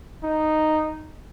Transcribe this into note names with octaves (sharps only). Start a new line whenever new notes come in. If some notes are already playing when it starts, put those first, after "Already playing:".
D#4